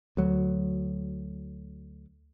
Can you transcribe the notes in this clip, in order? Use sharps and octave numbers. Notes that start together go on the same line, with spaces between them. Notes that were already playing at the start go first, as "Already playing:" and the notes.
D2 F#3